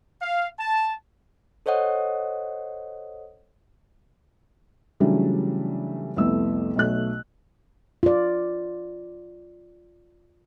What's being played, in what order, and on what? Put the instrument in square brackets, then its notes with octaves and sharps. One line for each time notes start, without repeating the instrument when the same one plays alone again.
[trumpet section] F5
A5
[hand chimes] A4 C5 C#5 D#5 F#5 D#6
[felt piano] C#3 E3 F#3 G3 A3 D4
C2 F2 A3 B3 E6
B1 B2 A3 F#6
[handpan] F4 D5